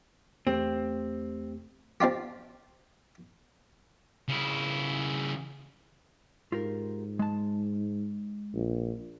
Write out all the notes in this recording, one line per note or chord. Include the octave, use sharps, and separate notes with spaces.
E2 A3 C4 G4
C4 D4 F4 G4
C#3 E4
G#2 F4 G4 A#4
G#3 A5
A#1